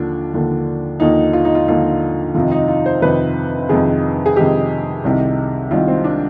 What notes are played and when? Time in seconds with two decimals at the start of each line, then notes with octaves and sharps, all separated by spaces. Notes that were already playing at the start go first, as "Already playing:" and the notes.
Already playing: D#2 D3 F3 D4
0.34 D#2 D3 F3
1.00 D#2 D3 F3 D#4
1.33 F4
1.45 D#4
1.55 F4
1.68 D#2 D3 F3 F4
2.35 F2 C3 D#3 F4
2.52 D#4
2.68 F4
2.86 C5
3.02 F2 C3 D#3 B4
3.69 F2 C3 D#3 G#4
4.26 G#4
4.36 F2 C3 D#3 G4
5.04 C2 C3 D#3
5.71 C2 C3 D#3 F4
5.88 C4
6.04 D4